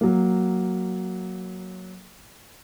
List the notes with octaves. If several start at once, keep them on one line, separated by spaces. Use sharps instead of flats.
F#3 A#3